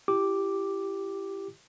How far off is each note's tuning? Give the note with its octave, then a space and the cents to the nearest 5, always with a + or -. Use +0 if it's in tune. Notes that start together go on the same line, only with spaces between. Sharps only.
E4 +35 G4 +0 D6 +0